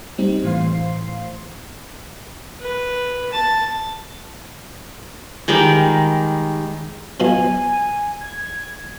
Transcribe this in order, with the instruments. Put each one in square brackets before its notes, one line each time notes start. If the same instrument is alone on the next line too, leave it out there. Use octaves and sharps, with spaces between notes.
[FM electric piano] G3 C4 D#4
A2 E3 C5 F5 C6 C7
[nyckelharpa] B4
A5
[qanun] D#3 G3 G#3 A#4
[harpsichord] B2 F3 F#3 [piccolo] G#5
[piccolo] G#6